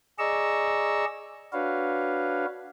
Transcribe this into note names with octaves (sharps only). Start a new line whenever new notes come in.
G#4 D5 D#5 A#5 C#6 E6
D4 F#4 B4 C#5 F5